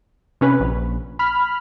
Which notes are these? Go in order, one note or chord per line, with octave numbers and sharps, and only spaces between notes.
C3 C#4 B4
A#1
B5 F6